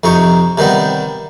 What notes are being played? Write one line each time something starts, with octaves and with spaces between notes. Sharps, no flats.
F2 C3 D#4 C#6
C3 D#3 G3 B3